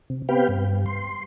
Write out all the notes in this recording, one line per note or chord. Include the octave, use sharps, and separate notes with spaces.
C3
B3 C4 G4 B4 F5 G5
G2
C6